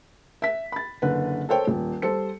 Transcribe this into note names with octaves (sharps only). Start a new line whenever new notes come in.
E5 B6
B5 A6
F#1 D3 B4
A4 A#4 C5 C#5 G5
D#1
G3 A4 C5 C#7